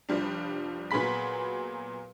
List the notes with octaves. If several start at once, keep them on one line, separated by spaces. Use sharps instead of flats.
F1 F3 G3 D4
A#2 F#3 B3 G#4 B5 B6